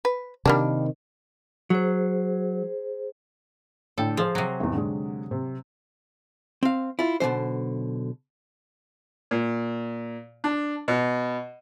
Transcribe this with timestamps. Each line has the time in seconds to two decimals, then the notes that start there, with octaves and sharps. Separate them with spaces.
0.05 B4
0.46 C3 D#3 G3 A#3 D4
1.70 F#3 G#4 C5
3.98 A2 D3 A4 G5
4.17 F3 G#4 C5
4.35 C3 F#3
4.60 G#1 E2
4.73 D3 G#3
5.31 C3
6.63 C4 F5
6.99 E4 F4
7.20 B1 B2 D3 E3 C5
9.31 A#2
10.44 D4
10.88 B2